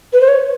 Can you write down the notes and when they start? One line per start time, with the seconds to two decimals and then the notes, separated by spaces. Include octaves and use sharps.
0.13 B4
0.21 C5
0.28 C#5